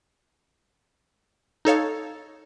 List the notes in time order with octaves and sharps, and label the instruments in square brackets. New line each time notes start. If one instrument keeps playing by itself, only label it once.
[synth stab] D#4 A4 C#5 F5